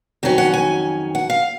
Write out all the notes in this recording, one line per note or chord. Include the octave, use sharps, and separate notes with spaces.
F2 D#3 F#3 C#4
F#5
G#5
F#5
F5